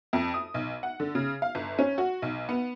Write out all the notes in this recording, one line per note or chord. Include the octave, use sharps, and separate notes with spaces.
F2
D#6
B1
F#5
D3
C#3
F5
G1
C#4
F#4
B1
B3